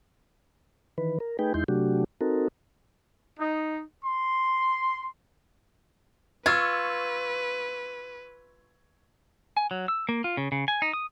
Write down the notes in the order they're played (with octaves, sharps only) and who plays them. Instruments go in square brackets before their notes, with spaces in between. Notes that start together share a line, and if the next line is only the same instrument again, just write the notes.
[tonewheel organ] D#3 E3 B4
A#4
A3 D#4 G#4 B4 G5
E2 G#3 D#4 E4 C6 G6
C3 F#3 A3 D4 F#4 G4
C4 D#4 F#4 A4 A#4
[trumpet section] D#4
C6
[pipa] F4 [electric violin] B4 [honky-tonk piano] C#6 E6 G#6
[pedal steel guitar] G#5
F#3
E6
A#3
F4
C#3
C#3
G#5
D#4
D#6